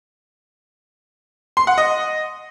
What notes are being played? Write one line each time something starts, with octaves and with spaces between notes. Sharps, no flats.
C6
F#5
D#5